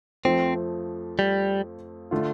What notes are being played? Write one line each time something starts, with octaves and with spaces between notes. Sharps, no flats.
F2 F3 A3 C4
G3
D3 A3 F4